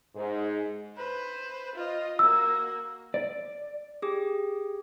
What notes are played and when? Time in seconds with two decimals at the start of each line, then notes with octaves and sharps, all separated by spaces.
0.16 G#2
0.97 B4 C5
1.76 F4 D#5
2.19 A#3 F#4 E6
3.14 D5
4.02 G4 G#4